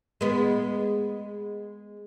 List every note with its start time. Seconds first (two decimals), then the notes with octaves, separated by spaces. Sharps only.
0.21 G#3 B3